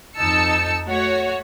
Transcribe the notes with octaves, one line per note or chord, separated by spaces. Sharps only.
F2 D#4 A5 E6 C#7
A3 F#4 C#5